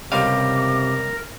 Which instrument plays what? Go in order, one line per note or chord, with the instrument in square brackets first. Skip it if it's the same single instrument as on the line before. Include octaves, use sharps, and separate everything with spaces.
[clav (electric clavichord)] C#2 G3 F5 [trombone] C3 [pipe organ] A#4 [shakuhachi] D6